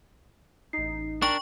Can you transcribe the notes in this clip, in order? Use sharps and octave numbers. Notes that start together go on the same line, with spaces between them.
A1 D#4 C7
D4 A#4 G5 C#6